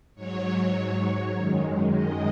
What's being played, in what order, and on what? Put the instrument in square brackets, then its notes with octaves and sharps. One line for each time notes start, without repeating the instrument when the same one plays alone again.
[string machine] G#2 F#3 C#5
F#2 D#3 G#3
D#5